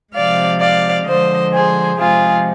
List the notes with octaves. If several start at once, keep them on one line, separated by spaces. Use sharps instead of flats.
C3 F3 G#3 D5 F5
D5 F5
D3 F3 G#3 C5 D#5
G#4 C5
C3 F3 G#3 F4 G#4